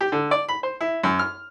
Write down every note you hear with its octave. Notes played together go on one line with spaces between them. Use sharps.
G4
D3
D5
B5
C5
E4
F#2
F6